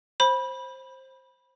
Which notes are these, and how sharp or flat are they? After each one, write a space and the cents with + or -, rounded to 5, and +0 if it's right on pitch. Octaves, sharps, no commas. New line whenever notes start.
C5 +15 B5 -15